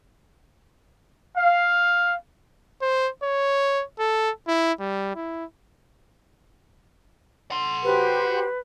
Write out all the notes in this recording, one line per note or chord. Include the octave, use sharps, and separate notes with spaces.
F5
C5
C#5
A4
E4
G3
E4
F#5 C6
F#4 G4 B4 C5